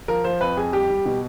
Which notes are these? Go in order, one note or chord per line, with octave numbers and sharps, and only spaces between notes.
F3 A#4
F3 C5
F2 B4
F2 G#4
G3 G4
G3
B2